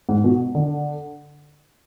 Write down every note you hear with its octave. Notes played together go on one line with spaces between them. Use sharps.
G#2
B2
D3